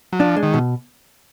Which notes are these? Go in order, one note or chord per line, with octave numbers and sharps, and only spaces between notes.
F#3
F3 D4
G#3
D#3
B2